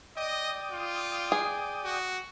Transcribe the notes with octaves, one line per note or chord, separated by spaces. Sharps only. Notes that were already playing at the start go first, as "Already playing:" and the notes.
D5 D#5 G5 D#6
F4
G#4
F#4